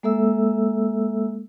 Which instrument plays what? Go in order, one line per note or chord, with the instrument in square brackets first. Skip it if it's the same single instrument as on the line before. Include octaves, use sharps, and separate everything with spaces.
[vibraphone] G#3 A#3 A4 E5 E6